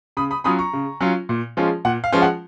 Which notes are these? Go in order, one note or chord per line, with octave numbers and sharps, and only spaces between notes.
C#3 B5 D#6
B5 D#6
F#3 C#4 F4 B5 D#6
A#5 C#6
C#3
F#3 C#4 F4
A#2
F3 G#3 C#4 F4
A#2 F#5
F5
F3 G#3 C#4 F4
F#5